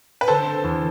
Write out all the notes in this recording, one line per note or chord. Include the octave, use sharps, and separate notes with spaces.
B4
D3 A4 C5
C4
E2